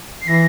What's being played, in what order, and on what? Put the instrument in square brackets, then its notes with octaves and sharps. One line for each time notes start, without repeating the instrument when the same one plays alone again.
[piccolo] C7
[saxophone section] E3 [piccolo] A#6